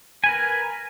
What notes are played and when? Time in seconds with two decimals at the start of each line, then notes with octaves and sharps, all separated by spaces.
0.24 G#5
0.26 B4
0.29 A#4